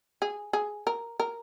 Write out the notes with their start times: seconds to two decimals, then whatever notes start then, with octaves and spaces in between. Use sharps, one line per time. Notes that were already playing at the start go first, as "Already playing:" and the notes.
0.22 G#4
0.53 G#4
0.87 A#4
1.20 A#4